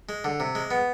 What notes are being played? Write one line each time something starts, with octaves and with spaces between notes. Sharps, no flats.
G#3
D3
C3
G#3
B3